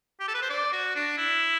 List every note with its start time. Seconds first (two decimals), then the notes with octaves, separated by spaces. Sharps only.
0.20 G4
0.28 A4
0.34 B4
0.42 C5
0.49 D5
0.72 F#4
0.95 D4
1.17 E4